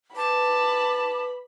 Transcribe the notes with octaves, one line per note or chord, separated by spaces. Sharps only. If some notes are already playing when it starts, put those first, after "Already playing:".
B4 A5 B5 D6